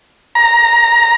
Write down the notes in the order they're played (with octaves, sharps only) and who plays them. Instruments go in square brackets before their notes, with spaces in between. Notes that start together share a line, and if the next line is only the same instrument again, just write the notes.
[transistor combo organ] A#5